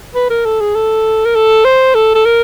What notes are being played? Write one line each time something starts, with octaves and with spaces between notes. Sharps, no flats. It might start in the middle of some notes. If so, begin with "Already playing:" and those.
B4
A#4
A4
G#4
A4
A#4
A4
C5
A4
A4
A#4